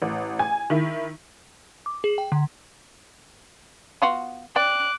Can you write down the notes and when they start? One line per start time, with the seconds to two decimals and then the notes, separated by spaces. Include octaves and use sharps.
0.02 A1
0.39 G#5
0.70 D#3 E4
1.86 D6
2.04 G#4
2.18 G5
2.32 D3
4.02 B3 F4 F#4
4.56 D5 G5 D6 F#6